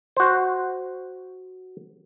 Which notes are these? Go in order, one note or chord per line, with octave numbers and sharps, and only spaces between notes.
F#4 C5